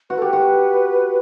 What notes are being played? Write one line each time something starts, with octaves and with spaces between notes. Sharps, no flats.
F#4 B4
A4
G4 B4
F#4